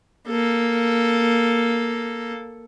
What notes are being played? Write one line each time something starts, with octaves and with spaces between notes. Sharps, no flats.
A#3 A4